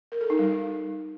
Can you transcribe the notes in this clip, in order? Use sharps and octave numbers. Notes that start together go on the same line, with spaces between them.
A#4
A4
D#4
G3